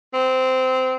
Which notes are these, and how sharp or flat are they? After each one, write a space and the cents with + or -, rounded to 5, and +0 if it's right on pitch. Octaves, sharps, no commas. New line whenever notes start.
C4 -15